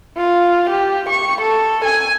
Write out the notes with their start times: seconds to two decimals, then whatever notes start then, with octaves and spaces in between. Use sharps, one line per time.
0.17 F4
0.70 G4
1.09 C#6
1.41 A4
1.85 G#5